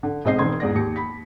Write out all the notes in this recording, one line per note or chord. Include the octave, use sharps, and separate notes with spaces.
D3
B1 G#3 C4 D#5 D#6 C7
E1 D#3 C4 C6 G#6
E2 G#2 D5 A#6
D#2 G4 C#7
B5 B6